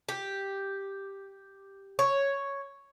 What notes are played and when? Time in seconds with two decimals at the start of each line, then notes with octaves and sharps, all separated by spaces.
0.09 G4
1.99 C#5